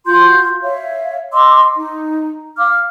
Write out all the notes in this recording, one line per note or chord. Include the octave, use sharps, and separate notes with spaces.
F4 F#4 C6 G6
C#5 E5 F5
D#5 C6 D6 E6
D#4
F5 D6 F6